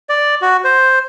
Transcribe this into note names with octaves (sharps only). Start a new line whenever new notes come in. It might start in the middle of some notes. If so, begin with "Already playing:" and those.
D5
F#4
C5